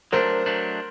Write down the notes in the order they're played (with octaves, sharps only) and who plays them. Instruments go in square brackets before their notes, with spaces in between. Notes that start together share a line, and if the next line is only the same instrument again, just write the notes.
[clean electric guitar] F#3 A3 D4 [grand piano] A#4 C5
[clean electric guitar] F#3 A3 D4